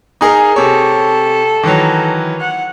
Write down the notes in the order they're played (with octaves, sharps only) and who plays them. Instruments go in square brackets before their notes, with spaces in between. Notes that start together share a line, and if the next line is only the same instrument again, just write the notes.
[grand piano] D#4 G#4 A#4
[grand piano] C3 C#5 [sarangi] A4
[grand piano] D#3 E3 F#3
[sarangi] F#5